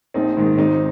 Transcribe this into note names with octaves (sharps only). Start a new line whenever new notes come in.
A#1 C4 D#4
G#2 D#3
G#1 C4 D#4